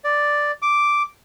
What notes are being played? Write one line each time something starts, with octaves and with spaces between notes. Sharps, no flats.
D5
D6